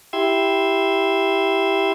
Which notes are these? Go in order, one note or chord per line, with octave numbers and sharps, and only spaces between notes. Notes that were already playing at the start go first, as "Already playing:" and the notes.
E4 G4 C6 E6 G#6